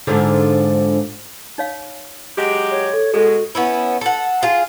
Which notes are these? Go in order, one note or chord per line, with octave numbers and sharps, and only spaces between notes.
G#2 D3 F3
D#4 C#5 F5
F#3 G#3 G4
C#5
A4
B2 G#3 F#4 G#4 A4
B3 C#4 E4
A4 F#5
F4 G#4